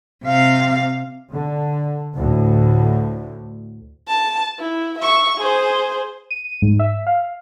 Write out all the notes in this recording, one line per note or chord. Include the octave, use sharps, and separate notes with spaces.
C3 F5
D3
D2 A2 D3
A5
E4
E5 C#6
G#4 C5
D#7
G#2
E5
F5